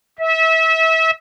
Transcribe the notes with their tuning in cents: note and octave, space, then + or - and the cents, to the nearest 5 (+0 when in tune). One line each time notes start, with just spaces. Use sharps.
E5 -30